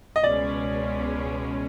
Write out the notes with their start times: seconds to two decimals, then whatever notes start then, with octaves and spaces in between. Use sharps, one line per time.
0.16 D#5
0.24 C#2 B2 G#3 C#4 D5